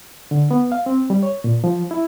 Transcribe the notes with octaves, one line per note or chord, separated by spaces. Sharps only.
D3
B3
F5
C4
G3
C#5
A#2
F3
E4